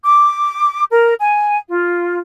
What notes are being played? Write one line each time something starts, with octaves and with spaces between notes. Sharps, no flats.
D6
A#4
G#5
F4